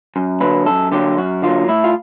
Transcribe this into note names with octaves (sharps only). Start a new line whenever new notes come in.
F#2
D3 F#3 A#3 B4
F#2 A4
D3 F#3 A#3 G4
F#2 F#4
D3 F#3 A#3 F4
A2 E4
F4